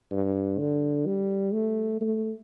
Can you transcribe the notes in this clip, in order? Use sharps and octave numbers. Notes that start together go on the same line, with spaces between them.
G2
D3
G3
A3
A3